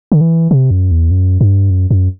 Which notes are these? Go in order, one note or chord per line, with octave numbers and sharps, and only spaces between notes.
D3
E3
C3
F#2
E2
F#2
G2
F#2
F#2